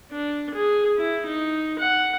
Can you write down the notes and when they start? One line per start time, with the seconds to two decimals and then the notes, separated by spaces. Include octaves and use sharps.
0.12 D4
0.54 G#4
0.97 E4
1.26 D#4
1.79 F#5